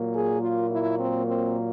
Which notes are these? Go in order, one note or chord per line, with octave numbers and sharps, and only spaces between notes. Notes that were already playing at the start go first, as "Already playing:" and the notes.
Already playing: A#2 F#3 A#3
G#4
F4
E4
C4
C4